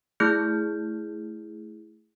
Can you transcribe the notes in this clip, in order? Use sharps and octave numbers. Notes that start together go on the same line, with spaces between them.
A3 E4 G#4 F6 G6